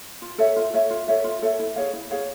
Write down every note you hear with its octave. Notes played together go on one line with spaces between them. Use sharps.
F4
A4 C#5 E5
F4
A4 C#5 E5
F4
A4 C#5 E5
F4
A4 C#5 E5
E4
G#4 C#5 F5
E4
G#4 C#5 F5